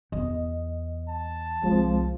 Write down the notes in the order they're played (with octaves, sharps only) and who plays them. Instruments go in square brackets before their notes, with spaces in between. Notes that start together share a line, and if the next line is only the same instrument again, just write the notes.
[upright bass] E2 [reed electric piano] D#5
[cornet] A5
[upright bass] C2 [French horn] F3 [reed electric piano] G#3 C4